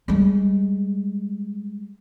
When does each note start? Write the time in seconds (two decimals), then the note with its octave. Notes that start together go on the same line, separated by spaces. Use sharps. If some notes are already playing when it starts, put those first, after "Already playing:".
0.08 G3 G#3